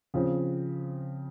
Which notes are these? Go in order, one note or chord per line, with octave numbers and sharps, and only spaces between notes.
C#3 F3 C4